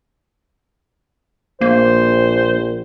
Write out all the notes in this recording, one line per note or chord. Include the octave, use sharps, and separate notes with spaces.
A#1 A#3 C5